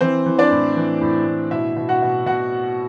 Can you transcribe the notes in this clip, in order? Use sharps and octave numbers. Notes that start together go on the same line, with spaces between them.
E3 C4 C5
E3
D4 D5
A2
E3
A2
A2
B2 E4 E5
B2
F#4 F#5
B2
B2 F#4 F#5